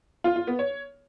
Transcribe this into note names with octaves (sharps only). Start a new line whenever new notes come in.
F4
F4
B3
C#5